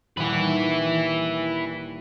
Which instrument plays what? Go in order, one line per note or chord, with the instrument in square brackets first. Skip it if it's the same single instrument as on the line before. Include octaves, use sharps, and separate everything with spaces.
[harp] D#1 F#5 [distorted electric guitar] E4 B4